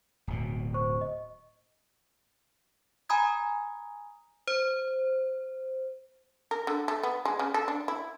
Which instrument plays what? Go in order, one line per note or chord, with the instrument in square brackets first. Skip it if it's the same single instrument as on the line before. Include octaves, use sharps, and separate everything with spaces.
[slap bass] D1 B2
[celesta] C5 C#6
D#5
[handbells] G#5 A#5 B5 D#6 G#6
[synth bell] C5
[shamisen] A#4
D3
A3
B3
G#3
C#3
A4
D4
E4